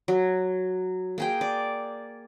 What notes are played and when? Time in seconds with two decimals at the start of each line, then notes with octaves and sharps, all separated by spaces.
0.08 F#3
1.18 A#3 G#4 G5
1.41 D5